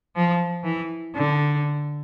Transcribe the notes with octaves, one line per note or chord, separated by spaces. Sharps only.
F3
E3
D3